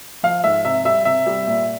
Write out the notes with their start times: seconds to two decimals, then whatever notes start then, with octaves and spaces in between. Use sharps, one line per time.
0.23 F3 F5
0.44 G#2 E5
0.65 C3 E5
0.85 G3 E5
1.05 C3 E5
1.27 G3
1.47 A#2